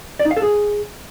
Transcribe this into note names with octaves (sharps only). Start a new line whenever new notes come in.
D5
D#4
F5
A4
G#4